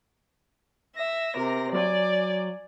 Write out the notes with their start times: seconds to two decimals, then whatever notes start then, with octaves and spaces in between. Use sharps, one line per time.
0.96 E5 A#6
1.35 C3 A#4
1.73 F#3 D5 G#5